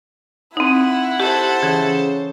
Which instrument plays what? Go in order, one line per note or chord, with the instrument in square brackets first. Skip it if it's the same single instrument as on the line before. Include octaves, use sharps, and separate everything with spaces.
[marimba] C4 D#4 [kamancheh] E4 F#5
[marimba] G4 [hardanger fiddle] A4 C5
[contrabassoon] C#3 [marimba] E3